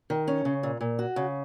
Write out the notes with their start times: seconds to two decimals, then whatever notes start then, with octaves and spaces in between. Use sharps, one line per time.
0.10 D#3
0.27 C#4
0.45 C#3
0.63 A#2
0.81 A#2
0.99 F#4
1.16 C#3